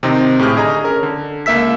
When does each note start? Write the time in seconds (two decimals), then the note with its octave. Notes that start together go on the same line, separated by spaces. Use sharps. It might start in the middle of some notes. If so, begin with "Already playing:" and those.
0.03 C3 D#3 C4 D#4
0.39 A2 G4 G#4 F6
0.56 D3 G#4 D#5 A#5
0.84 C#4 A#4
1.03 D3
1.46 C#2 A#3 E5 E6 B6